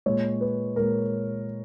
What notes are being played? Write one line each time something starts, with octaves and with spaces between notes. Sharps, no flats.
A#2 G#3 C#5
B4
A#2 G#3 A#4